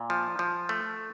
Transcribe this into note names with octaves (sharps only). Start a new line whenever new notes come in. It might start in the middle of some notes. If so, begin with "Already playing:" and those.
Already playing: A#2
F3
F3
A3